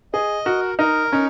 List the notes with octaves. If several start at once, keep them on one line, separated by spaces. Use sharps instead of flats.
G#4 D#5
F#4 A#4
D#4 A#4
C#4 D#4